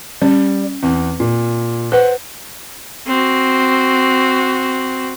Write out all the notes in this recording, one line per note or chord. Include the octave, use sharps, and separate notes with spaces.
G3 C#4
E2 C4
A#2
B4 C5 F#5
C4 F#4